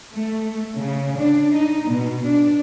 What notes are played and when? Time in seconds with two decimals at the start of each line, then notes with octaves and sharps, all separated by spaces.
0.14 A3
0.75 C#3
1.16 D4
1.55 D#4
1.87 B2
2.26 D4